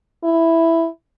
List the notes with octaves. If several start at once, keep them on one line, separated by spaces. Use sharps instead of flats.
E4